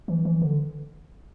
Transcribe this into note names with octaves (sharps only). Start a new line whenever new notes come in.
E3
E3
D3